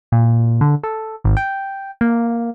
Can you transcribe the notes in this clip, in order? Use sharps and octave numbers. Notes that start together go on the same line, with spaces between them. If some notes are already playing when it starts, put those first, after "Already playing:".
A#2
D3
A4
G#1
G5
A#3